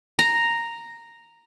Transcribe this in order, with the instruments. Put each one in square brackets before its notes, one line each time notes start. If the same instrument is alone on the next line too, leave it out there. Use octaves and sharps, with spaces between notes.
[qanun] A#5